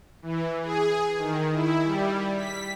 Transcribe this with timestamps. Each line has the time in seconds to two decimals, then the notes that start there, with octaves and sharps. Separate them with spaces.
0.22 E3
0.63 G#4
1.18 D#3
1.53 E4
1.84 G3
2.36 B6